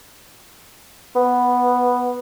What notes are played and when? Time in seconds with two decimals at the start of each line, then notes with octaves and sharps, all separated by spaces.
1.15 B3